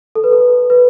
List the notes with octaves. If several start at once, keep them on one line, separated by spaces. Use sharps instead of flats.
A4
B4
A4
B4